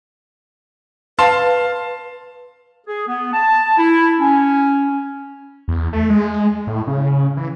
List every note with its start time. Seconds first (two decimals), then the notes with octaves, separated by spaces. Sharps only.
1.19 B4 F5 A5 C6
2.87 G#4
3.07 B3
3.34 A5
3.78 E4
4.20 C#4
5.68 E2
5.93 A3
6.10 G#3
6.67 A2
6.87 C#3
7.37 E3